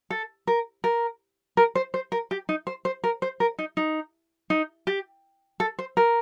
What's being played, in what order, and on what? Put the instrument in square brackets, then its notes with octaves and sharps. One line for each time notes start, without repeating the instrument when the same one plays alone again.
[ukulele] A4
A#4
A#4
A#4
C5
C5
A#4
G4
D#4
C5
C5
A#4
C5
A#4
D#4
D#4
D#4
G4
A4
C5
A#4